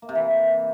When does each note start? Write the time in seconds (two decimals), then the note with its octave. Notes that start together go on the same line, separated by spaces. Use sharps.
0.02 A#3
0.09 C3
0.15 E3